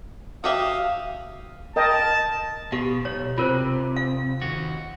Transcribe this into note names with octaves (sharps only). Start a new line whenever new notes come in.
F#4 G4 E5 F5 D#6
A#4 D#5 G5 A5
B2 G4 F5
B1 C#5
C3 F4 A#4 C5
F5
D#2 F#4